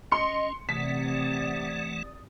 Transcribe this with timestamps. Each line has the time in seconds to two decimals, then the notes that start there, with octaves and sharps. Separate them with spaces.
0.12 C#4 D#5 C6 C#7
0.69 C3 E3 A3 D5 F#5 D#6 B6